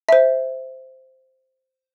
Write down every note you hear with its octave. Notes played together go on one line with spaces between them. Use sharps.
C5 E5